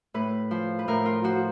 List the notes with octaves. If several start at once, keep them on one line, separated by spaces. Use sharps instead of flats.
A2 B4
F3
B4
A2 A#4
F4
F3 F#4